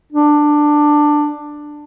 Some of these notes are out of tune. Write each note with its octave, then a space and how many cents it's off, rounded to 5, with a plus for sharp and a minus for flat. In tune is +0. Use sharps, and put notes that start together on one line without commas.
D4 +10